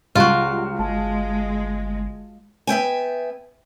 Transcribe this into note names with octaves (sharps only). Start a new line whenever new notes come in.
C#2 G3 F4 F#4 D7
G1 G#3 A5
B3 E5 G5 G#5